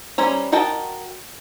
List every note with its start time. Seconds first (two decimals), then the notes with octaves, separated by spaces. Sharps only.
0.18 G3 C#4 C5 A#5
0.52 F#4 A#4 D#5 G5 A5